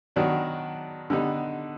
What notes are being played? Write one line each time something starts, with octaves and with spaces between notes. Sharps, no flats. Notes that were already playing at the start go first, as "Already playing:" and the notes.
D#3 F#3 B3 D4 F#4
D3 G3 B3 D#4